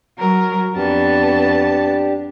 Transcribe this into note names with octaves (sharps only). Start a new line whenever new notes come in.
F#3 A#4
F2 B3 D4 G4 A5